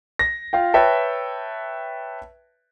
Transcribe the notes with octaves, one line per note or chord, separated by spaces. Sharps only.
A#6
F4 F5 G5
B4 C#5 E5 G5 A5